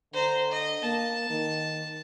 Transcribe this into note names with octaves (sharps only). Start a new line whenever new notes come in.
D3 C5 A#5
D#5
A#3 A5
D#3